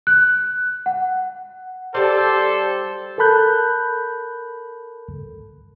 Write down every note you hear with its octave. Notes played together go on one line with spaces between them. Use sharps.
F#6
F#5
G3 A4 C5 D5
A4 A#4 A5 B5 F#6 G6